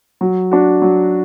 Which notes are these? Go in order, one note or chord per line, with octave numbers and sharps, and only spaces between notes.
F#3
D4 F#4
F#3